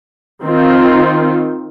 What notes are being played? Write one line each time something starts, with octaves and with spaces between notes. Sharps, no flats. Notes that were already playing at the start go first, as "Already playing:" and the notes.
D#3 C4 D#4 F4